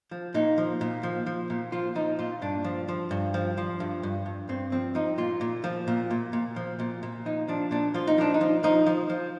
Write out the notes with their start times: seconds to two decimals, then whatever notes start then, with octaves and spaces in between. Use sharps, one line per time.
0.11 F3
0.34 A#2 D#4
0.58 F3
0.81 A#2
1.03 F3
1.27 F3
1.50 A#2
1.72 F3 F4
1.95 F3 D#4
2.19 A#2 F4
2.42 G2 D4
2.64 F3
2.89 F3
3.11 G2
3.34 F3
3.58 F3
3.80 G2
4.03 G2
4.26 G2
4.49 G2 C4
4.72 F3 C4
4.95 F3 D#4
5.18 A#2 F4
5.41 A#2
5.64 F3
5.88 A#2
6.11 A#2
6.33 A#2
6.56 F3
6.80 A#2
7.03 A#2
7.26 F3 D#4
7.48 F3 D4
7.71 A#2 D4
7.94 F3 F4
8.07 D#4
8.18 F3 D4
8.34 D#4
8.41 F3
8.64 F3 D#4
8.86 F3
9.10 F3